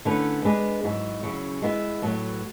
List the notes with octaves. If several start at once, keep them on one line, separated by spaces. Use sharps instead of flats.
D3 A3 C#4 E4 B4
G#3 B3 D4 G#4 B4
G#2 F#3 B3 E4
C#3 F#3 C#4 E4
G#3 B3 E4
A2 F#3 B3